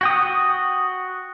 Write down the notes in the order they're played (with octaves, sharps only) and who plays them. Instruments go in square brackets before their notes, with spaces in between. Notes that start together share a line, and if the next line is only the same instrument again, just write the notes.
[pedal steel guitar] F#4 G5 D#6